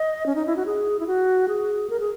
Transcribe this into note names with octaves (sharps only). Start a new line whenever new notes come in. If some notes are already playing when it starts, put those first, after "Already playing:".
Already playing: D#5
C#4
D#4
E4
F#4
G#4
E4
F#4
G#4
A#4
G#4